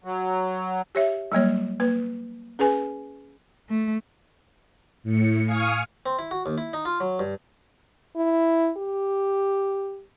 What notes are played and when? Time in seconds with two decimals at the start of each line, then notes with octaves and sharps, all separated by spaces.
0.04 F#3
0.95 G4 C#5 E5
1.32 F#3 G3 A#3 C#5
1.80 A#3 B4
2.59 C#4 G#4 B4 G#5
3.69 A3
5.04 A2 C#7
5.46 F5 G#5 C#6 D#6 F6 C#7
6.06 C4
6.19 E4
6.31 F#4
6.46 D#2
6.58 E4
6.73 D#4
6.85 F4
7.00 F#3
7.19 G2
8.16 E4
8.77 G4